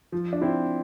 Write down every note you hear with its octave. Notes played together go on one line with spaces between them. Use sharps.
F3
D4
C4 E4